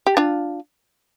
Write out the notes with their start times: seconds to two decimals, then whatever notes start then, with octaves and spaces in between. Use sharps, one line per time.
0.06 G4
0.17 D4 F4